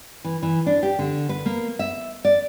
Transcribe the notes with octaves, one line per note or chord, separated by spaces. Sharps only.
E3
E3
D4
G4
D3
B4
A#3
E5
D5